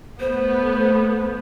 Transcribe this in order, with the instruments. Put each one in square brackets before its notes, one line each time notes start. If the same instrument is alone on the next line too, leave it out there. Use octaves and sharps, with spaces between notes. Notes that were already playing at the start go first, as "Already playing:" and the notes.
[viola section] A3 B3 [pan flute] C5